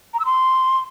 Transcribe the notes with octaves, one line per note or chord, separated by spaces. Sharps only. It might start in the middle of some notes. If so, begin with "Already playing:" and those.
A#5
E6
C6